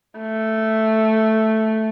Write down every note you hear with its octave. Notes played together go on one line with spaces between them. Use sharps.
A3